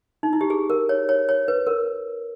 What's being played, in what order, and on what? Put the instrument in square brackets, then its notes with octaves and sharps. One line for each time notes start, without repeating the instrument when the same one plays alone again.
[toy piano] D#4
E4
G4
G#4
A#4
C#5
C#5
C#5
B4
A#4